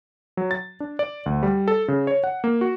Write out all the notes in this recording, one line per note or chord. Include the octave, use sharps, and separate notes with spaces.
F#3
A6
D4
D5
D2
G3
A4
C#3
C#5
F#5
A#3
F#4